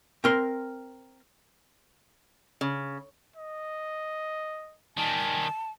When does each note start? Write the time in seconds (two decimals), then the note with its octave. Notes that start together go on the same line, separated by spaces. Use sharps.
0.24 C4 A#4 C6
2.61 C#3
3.36 D#5
4.97 D#3 G3 G#5 A5